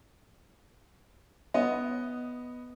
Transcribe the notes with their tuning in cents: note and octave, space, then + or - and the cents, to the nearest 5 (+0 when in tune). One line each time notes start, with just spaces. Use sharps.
B3 +0 D#5 +0